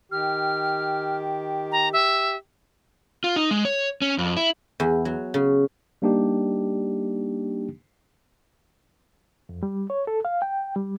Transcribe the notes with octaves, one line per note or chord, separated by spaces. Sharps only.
D#3 G4 F6
A#5
G4 E5
F4
D#4
G#3
C#5
C#4
F2
E4
E2
F#3
C#3
G3 A#3 D4 D#4 G4
F2
G3
C#5
A4
F5
G5
G3